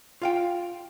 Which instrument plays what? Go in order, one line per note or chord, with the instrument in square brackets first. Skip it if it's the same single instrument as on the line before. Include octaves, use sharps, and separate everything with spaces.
[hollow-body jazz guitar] F4 F5 G5